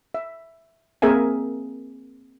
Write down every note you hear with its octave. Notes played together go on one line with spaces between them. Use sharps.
E5
A#3 C4 G#4 A#4 E5 G#5